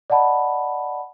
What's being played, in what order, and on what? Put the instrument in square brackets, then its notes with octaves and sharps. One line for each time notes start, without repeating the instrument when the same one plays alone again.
[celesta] D5 D#5 F#5 A5 B5